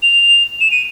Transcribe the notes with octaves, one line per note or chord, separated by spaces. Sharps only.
F7
E7
D#7